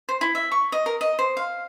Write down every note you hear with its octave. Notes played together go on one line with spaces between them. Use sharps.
C5
E4
E5
C#6
D#5
A#4
D#5
C5
F5